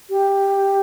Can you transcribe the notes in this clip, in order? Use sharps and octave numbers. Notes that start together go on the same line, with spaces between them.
G4